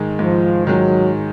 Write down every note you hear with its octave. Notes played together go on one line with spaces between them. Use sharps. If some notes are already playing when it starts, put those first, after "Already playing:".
Already playing: G#2 D#3 G#3
G#2 F3
D#3 F#3 G#3